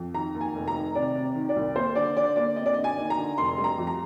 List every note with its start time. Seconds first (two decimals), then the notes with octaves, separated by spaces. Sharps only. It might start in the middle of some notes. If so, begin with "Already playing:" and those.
Already playing: F2
0.14 D#3 A#5
0.35 D#2
0.41 G#5
0.55 F1
0.68 A#5
0.74 D#3
0.94 C3 D5
1.15 C3
1.35 D#3
1.49 D5
1.56 C2
1.76 A#3 C5
1.95 D3 D5
2.16 D3 D5
2.36 A#3 D5
2.56 C4 D#5
2.66 D5
2.74 D3 D#5
2.84 G#5
2.97 D#2
3.10 A#5
3.18 D3
3.37 F1 C6
3.58 G3
3.64 A#5
3.78 F2
3.87 A#5